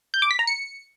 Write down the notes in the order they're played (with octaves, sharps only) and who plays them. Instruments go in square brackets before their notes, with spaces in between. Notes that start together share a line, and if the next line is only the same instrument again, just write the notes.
[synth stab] G6
D6
B6
A#5
C#7